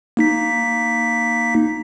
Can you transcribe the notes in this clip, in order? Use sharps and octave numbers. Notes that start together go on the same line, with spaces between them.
A#3 D#4 B6